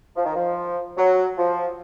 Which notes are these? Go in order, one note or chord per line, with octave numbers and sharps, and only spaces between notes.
F3
D#3
F3
F#3
F3